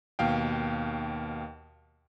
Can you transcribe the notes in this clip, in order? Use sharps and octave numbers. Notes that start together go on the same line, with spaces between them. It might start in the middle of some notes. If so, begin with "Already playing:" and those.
D#2 B2 F5 G5